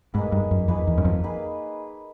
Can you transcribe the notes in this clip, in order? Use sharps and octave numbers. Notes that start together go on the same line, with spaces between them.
G#2 A#3 D#4 G#4 B4
G2
F#2
F2 A#3 D#4 G#4 B4
E2
F#2
F2
A#3 D#4 G#4 B4